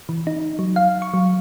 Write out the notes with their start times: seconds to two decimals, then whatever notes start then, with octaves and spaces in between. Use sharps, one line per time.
0.09 E3
0.27 D#4
0.59 F#3
0.76 F5
1.02 C#6
1.14 F#3